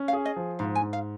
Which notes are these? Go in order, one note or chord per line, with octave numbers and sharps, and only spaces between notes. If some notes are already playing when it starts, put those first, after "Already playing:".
Already playing: C#4
F5
G#4
D#5
F3
G#2 F5
G#5
G#2
F5